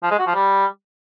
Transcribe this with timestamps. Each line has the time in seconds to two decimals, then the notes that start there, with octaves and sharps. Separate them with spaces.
0.03 F3
0.11 G#3
0.19 F#4
0.27 F3
0.35 G3